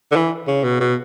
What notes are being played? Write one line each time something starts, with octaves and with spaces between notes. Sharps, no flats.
D3
E3
C#3
B2
B2